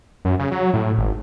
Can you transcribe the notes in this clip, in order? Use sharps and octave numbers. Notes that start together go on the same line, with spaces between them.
F#2
C#3
F#3
A2
G#1